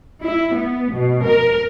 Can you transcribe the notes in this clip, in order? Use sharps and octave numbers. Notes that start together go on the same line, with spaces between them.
E4
B3
B2
A#4